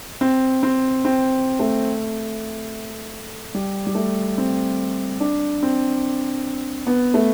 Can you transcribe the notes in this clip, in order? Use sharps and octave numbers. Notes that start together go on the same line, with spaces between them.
C4
C4
C4
A3
G3
G3
A3
C4
D4
C4
B3
A3